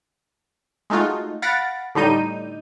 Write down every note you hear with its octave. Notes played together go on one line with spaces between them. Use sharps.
G#3 A3 D#4 F4 F#4
F5 F#5 B5 A6 A#6 D7
A2 D3 G3 D#4 G6 D#7